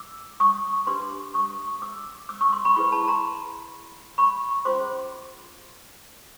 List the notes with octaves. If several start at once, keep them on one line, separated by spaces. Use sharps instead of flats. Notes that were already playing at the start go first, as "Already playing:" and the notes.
Already playing: D6 E6
C#6 D#6
D4 G4 B4 C6 D6
C#6 D#6
D6 E6
D6 E6
C#6 D#6
C6 D6
B5 C#6
E4 G#4 B4 B5 C#6
A5 B5
A#5 C6
B5 C#6
C#4 F4 G#4 C5 C6 D6